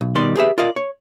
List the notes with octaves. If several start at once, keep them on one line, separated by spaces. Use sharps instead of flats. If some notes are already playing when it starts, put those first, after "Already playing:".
B1
B2 D#3 G3 D5 C6
G4 G#4 B4 E5
F4 A#4 D5 D#5 F5
C#5